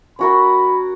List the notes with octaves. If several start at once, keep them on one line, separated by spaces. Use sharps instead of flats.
C#4 F#4 A#4 B5